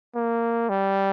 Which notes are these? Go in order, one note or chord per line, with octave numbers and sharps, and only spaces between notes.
A#3
G3